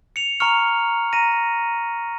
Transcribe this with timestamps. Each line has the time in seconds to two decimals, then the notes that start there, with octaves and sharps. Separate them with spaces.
0.16 C#7 F7
0.40 A#5 C#6 F6 C#7 F7
1.13 A#5 A#6 D#7